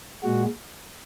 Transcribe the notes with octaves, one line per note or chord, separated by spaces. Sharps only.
A#2 G#3 F#4